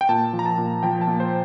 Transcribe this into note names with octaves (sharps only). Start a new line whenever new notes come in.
G5
A#2 A5
F3
A#5
A5
A#2
F3 G5
A5
A#2
C5